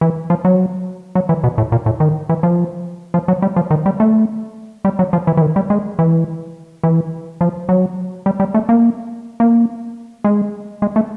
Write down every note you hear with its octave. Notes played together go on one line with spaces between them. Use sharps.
E3
F3
F#3
F#3
E3
B2
A2
A#2
A2
D#3
E3
F3
F3
F#3
G3
F3
D#3
G3
A3
G3
F#3
F3
E3
E3
D#3
G3
G#3
E3
E3
F3
F#3
G3
G3
A3
A#3
A#3
G#3
G#3
A3